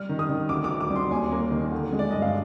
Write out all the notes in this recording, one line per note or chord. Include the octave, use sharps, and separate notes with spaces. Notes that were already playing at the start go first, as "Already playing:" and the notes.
Already playing: G3 F6
D#3
D#6
D#3
D2 D6
D6
D2
D6
G3
C6
D#2 G#5
A#3
D#3
D3
G#3
D5
G2 D#5
F5